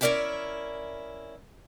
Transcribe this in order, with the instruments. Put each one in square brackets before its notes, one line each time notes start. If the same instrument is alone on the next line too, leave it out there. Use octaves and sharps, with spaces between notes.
[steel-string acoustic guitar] C#4 E4 A#4 D5 E5 G5